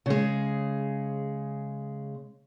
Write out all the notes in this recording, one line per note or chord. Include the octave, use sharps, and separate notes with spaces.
C#3 G#3